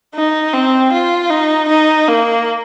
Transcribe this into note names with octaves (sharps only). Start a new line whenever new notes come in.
D#4
C4
F4
D#4
D#4
A#3